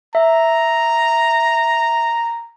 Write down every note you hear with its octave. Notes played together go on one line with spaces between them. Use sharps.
E5 A#5